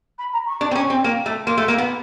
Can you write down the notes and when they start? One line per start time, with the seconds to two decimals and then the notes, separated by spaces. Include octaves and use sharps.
0.19 B5
0.33 A#5
0.47 C#6
0.61 D4
0.71 C4
0.75 C#4
0.90 C4
1.04 A#3
1.26 A3
1.47 A#3 C6
1.58 A3
1.68 A#3
1.78 B3